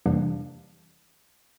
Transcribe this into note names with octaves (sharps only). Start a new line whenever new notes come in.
F2 C3 E3 G3 A#3 D4